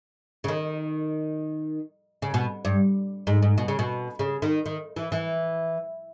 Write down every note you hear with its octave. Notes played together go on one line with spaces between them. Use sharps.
C#3
D#3
C#3
B2
G2
G#2
G#2
B2
C#3
B2
C#3
D#3
D#3
E3
E3